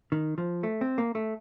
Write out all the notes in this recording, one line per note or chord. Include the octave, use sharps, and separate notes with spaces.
D#3
F3
A3
C4
A#3
A3